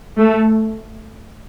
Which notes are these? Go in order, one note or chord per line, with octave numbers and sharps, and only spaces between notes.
A3